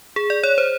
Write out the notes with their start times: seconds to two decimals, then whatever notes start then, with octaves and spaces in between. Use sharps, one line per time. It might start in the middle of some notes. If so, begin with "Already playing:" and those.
0.16 G#4
0.30 D5
0.43 C#5
0.58 C5